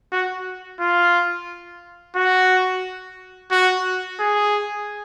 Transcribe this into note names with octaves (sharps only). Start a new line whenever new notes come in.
F#4
F4
F#4
F#4
G#4